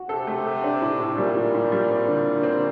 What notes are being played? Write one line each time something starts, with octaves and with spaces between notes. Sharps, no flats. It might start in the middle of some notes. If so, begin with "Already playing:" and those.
Already playing: F#4
C3 A4
A3
A4
D4
A2
A2
A#2 G3
A2
A2
G3
C4
D3
D3
C4